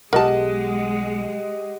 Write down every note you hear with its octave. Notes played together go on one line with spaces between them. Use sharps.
B1 G#3 G4 A#4 D#5 F#5 A5